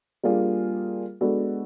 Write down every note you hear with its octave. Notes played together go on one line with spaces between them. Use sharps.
G3 A#3 D4 F4 G#4
G#3 B3 D4 F#4 A4